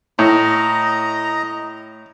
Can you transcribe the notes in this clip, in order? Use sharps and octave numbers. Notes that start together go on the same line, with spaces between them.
A2 D#5 A#5